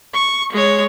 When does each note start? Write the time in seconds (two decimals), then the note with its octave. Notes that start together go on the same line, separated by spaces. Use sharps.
0.14 C#6
0.52 G#3 C#5